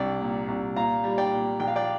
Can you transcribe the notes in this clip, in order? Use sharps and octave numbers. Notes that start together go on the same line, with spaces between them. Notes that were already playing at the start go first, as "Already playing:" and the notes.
Already playing: C2 D4 D5 G5
A#2
C2
A#2 F5 A#5
G3
D5 G5
A#2
A#1 G5
F5
D5 G5